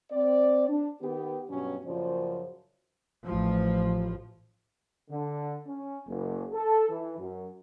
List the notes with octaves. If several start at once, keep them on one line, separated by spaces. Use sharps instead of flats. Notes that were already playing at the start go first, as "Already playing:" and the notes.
C4 D5
D4
D#3 B3 G4
G2 B2 F#3 C#4
F#2 A#2 C#3 F3 C5 D5
A1 F3
D3
C#4
F#1
A4
E3
F#2